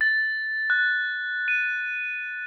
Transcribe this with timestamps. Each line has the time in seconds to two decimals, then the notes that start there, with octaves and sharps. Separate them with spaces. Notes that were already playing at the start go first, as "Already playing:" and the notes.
0.01 A6
0.70 F#6
1.48 D#7